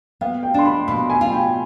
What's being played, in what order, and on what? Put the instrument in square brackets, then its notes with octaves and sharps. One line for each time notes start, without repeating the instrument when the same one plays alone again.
[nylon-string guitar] B3 [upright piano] F5
[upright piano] G5
[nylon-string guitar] D4 [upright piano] C6
[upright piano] B5
[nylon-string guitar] B2 [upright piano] B5
[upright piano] G#5
[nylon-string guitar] F4
[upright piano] G5